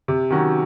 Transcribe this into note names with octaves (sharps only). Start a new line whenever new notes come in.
C3
D#3 F#3 C#4 F#4